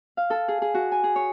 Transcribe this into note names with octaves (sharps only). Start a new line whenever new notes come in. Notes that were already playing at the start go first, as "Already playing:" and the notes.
F5
A4
G#4
G#4
F#4
G#5
G#4
C#5